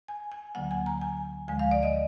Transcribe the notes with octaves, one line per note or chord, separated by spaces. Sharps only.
G#5
G#5
D2 D3 F#3 A#3 F#5
G#5
A#5
G#5
D2 D3 F3 G#3 G#5
F5
D5
D#5